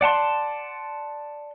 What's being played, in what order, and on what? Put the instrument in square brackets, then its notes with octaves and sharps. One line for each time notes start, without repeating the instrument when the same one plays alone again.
[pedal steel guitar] D5 F#5 A5 C6